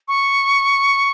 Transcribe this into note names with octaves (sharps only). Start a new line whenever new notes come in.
C#6